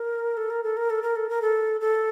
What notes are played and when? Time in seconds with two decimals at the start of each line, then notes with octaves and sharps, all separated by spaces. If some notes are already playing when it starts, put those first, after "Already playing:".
Already playing: A#4
0.37 A4
0.50 A#4
0.64 A4
0.77 A#4
0.90 A4
1.03 A#4
1.16 A4
1.29 A#4
1.42 A4
1.81 A4